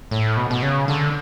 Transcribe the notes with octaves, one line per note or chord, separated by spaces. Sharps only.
A2
B2
B2
C#3
D3